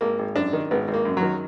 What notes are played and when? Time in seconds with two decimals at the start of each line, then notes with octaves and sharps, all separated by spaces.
0.01 G#1 A#3
0.19 G#1
0.36 F#2 D4
0.53 D#3
0.71 G#1 B3
0.88 G#1
0.94 A#3
1.05 F#2
1.17 F#3
1.22 D#3